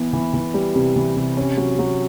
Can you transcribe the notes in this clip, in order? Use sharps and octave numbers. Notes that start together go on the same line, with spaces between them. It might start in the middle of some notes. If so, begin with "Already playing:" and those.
Already playing: E3 B3
E3
E3
G3
C3
E3
C3
C#4
F#3
F#3